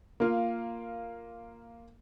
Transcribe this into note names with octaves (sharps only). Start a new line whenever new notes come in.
A#3 F4